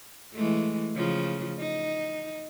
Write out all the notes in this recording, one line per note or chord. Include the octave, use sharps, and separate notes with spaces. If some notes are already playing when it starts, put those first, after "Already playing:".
E3 G#3 A3
C#3 F3
D#4